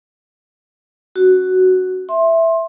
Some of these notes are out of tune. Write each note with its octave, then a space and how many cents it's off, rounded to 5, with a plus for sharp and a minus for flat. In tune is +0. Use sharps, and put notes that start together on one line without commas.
C#4 +0 F#4 +5
E5 +0 C6 +20